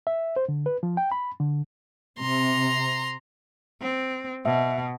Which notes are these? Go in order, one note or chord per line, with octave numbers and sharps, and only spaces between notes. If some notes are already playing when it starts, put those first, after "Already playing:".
E5
C5
D3
B4
F3
G5
B5
D3
C3 A#5 C6
C4
B2 E5